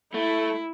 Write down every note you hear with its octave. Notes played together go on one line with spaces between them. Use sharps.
A3 E4